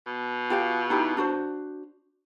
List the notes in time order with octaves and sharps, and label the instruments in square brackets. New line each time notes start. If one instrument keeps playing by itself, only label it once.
[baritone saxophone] B2
[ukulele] F4 G4 F5
D#4 E4 G4
D4 F#4 C5